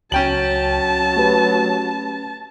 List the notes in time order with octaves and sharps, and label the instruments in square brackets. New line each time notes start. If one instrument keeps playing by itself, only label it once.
[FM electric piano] C#2 [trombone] F#3 [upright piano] C#4 G5 F#7 [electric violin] A5
[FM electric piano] A3 G4 B4